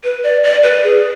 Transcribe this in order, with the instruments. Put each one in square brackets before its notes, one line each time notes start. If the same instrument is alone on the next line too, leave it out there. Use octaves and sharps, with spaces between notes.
[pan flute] B4
D5
D5
B4
G#4